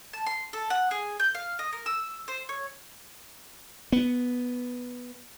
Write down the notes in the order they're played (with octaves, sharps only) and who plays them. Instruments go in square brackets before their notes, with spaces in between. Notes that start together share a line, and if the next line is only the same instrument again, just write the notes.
[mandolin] A5
C6
A4
F#5
G#4
G6
F5
D#5
A#4
E6
C5
C#5
[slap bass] B3